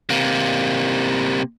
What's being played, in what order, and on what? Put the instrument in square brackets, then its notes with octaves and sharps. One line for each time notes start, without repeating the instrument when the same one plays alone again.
[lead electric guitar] C3 A#3